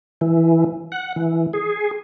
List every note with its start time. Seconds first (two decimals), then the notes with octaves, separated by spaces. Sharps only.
0.21 E3
0.92 F#5
1.16 E3
1.53 G#4